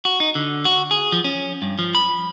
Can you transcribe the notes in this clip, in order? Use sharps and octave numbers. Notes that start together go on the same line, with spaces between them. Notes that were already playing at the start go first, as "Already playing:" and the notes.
F#4
D#4
D3
F#4
G#4
F3
C#4
G2
F3
B5